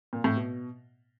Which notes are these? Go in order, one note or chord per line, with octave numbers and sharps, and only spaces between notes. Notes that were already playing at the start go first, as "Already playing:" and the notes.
A#2
A2
B2